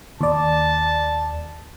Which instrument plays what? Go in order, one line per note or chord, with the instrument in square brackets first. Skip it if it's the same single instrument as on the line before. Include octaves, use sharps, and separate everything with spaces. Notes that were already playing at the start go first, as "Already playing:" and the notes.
[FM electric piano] D#2 D5 [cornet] A5